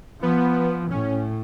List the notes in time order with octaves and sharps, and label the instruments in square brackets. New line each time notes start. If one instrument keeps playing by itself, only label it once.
[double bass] F3 [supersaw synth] B3
[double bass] A2 [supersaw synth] C#4